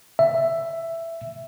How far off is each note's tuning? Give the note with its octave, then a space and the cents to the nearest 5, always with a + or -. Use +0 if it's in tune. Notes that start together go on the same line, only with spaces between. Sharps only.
E5 +10